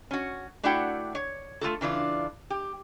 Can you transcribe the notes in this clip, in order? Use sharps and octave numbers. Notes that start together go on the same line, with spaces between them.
C#4 F#4
A3 D4 E4 F#4 F#5 G5
C#5
A3 F4 F#4 A4
C#3 E3 D4 F4
G4